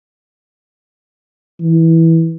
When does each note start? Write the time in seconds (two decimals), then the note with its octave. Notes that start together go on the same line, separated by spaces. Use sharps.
1.60 E3